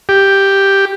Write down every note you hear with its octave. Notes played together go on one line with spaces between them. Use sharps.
G4